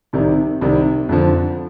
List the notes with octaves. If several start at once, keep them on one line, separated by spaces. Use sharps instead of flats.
C2 C3 D#3
C2 C3 D#3
F2 D3 F3